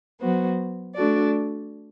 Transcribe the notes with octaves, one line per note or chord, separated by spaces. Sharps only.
F#3 B3 F#4 C5
A3 D4 F#4 A4 D5